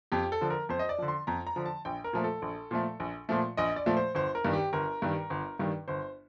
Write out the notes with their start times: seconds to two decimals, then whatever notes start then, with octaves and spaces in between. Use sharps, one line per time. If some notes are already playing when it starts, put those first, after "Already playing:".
0.12 F2 G4
0.32 A4
0.41 D3 F3
0.50 A#4
0.69 F2 C5
0.79 D#5
0.89 D5
0.98 D3 F3
1.08 C6
1.27 F2 A#5
1.47 A#5
1.56 D3 F3
1.66 A5
1.85 A#1 G5
2.04 A#4
2.13 A#2 F3 A3
2.24 A4
2.42 A#1
2.71 A#2 F3 A3
3.00 A#1
3.29 A#2 F3 A3
3.57 A#1 D#5
3.76 D5
3.86 A#2 F3 A3
3.97 C5
4.15 G1 C5
4.35 A#4
4.45 G2 D#3 G3
4.53 G4
4.73 G1 A#4
5.02 G2 D#3 G3
5.30 G1
5.59 G2 D#3 G3
5.88 G1 C5